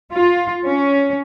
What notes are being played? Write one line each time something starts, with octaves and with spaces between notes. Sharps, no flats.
F4
C#4